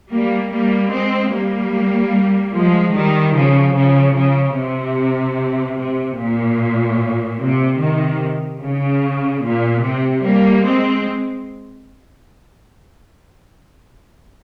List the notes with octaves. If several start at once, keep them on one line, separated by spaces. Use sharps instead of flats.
G3 A#3
G3 A#3
G#3 C4
G3 A#3
F3 G#3
D#3 G3
C#3 F3
C#3 F3
C#3
C3
C3
A#2
C3
C3 D#3
C#3
A#2
C3
G3 A#3
G#3 C4